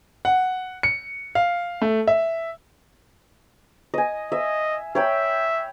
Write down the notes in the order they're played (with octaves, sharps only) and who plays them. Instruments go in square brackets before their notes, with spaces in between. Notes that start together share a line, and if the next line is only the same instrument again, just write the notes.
[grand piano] F#5
C#7
F5
A3
E5
[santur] D#5 G#5
[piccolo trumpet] D#5 [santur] E5
[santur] C#5 G5 B5 [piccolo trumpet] E5